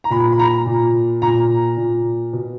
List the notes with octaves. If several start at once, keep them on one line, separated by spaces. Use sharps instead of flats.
A#5
A#2 B5
B5
A#5
A#2
A#2 A#5
A#2
B2